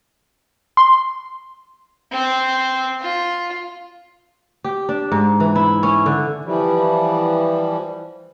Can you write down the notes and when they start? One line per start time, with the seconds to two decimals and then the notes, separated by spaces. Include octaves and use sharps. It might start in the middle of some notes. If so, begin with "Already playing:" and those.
0.77 C6
2.12 C4
3.02 F4
4.64 G4
4.89 D4
5.12 G#2
5.40 E3
5.56 E4
5.83 C#4
6.06 D3
6.45 E3 F3 G3